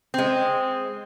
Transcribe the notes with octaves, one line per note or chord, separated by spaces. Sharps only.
G#3 C4